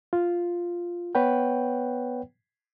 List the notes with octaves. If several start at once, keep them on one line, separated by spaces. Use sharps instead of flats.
F4
B3 B4 C#5 F#5 G5